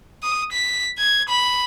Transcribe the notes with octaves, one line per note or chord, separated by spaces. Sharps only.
D#6
B6
G#6
B5